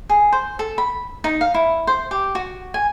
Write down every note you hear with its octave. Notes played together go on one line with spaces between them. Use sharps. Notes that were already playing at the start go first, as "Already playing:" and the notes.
G#4
C5
A4
B5
D#4
F5
E4
C5
G4
F#4
G#5